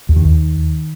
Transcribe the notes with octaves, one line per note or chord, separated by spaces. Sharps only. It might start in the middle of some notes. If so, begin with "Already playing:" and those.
D#2
D#3
D#2